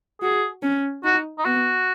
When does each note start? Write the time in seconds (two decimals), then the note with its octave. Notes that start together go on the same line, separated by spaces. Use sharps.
0.22 F#4 G#4
0.63 C#4
1.04 D#4 F#4
1.38 D#4
1.45 B3 F#4